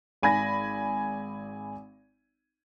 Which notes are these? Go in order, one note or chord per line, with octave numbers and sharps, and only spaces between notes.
G#1 G#5 B5 G#6 A#6